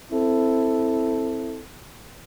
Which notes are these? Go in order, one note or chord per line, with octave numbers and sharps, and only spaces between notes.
C4 E4 A4